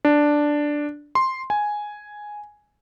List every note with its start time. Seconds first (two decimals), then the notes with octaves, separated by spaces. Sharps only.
0.05 D4
1.15 C6
1.50 G#5